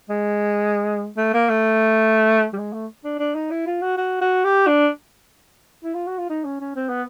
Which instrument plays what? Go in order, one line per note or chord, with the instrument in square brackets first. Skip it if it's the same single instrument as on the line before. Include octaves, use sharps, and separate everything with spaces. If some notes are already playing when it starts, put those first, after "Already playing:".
[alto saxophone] G#3
A3
A#3
A3
G3
G#3
A3
D4
D4
D#4
E4
F4
F#4
F#4
F#4
G4
D4
E4
F4
F#4
F4
D#4
C#4
C#4
C4
B3